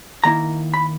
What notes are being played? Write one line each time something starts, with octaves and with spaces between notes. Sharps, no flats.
D#3 A#3 E4 A#5
B5